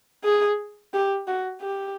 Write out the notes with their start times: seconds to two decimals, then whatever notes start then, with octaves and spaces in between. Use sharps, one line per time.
0.24 G#4
0.93 G4
1.27 F#4
1.61 G4